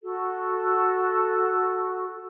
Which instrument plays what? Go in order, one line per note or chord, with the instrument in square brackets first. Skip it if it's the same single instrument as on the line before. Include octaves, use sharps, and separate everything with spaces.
[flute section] F#4 A4